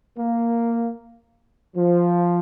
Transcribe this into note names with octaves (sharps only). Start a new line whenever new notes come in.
A#3
F3